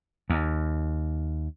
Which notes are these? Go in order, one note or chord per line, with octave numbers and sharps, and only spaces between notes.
D#2